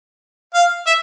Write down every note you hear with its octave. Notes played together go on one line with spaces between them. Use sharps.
F5
E5